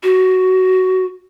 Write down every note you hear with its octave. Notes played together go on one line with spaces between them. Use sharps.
F#4